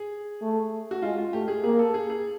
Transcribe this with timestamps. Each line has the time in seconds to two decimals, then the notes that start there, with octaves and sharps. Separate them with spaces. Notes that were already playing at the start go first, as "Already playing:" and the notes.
Already playing: G#4
0.42 A3
0.91 F#4
1.02 G#3 F4
1.18 F4
1.33 A3 G4
1.48 G#4
1.63 A#3 G#4
1.79 A4
1.94 G#4
2.10 G#4